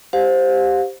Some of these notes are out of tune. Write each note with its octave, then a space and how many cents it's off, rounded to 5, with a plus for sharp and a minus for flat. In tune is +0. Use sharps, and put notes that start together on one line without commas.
G4 +0 C5 +0 F5 +40